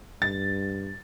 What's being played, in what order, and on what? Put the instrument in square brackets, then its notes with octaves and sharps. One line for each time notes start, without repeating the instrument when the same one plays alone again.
[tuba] G2 [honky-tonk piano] A6